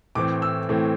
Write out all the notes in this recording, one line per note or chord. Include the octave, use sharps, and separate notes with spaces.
A2 E3 A3 C4 D6
E6
A2 E3 A3 C4